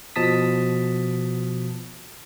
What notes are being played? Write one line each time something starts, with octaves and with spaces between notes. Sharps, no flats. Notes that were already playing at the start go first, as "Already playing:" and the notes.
B2 F3 A5 D#6 B6